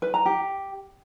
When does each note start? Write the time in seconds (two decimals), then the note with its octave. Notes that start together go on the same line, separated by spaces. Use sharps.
0.02 B4
0.14 A#5
0.26 G4